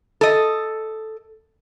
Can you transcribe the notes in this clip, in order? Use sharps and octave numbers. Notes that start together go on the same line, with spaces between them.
A4 D#5